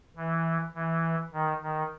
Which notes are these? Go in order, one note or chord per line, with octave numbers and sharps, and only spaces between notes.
E3
E3
D#3
D#3